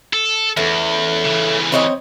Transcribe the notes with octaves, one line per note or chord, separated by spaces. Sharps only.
A4
E2 A3 C#4
C#3 E3
C4 C#5 D#5